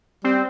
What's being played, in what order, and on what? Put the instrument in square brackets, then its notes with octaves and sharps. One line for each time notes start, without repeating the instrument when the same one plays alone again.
[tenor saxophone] G3 [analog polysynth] C4